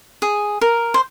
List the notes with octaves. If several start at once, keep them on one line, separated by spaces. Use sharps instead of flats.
G#4
A#4
C5